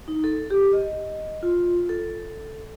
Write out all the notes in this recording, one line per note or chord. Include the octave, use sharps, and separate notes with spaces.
D#4
A4
G4
D#5
F4
A4